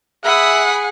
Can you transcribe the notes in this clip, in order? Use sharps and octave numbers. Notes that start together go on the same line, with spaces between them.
G#4 E5 F#5 G#5 B5 D#6